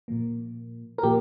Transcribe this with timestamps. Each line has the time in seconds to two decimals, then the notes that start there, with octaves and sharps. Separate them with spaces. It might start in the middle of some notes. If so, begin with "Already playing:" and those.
0.08 A#2 F3 A#3
0.98 A#4
1.03 A#2 F3 A#3 G4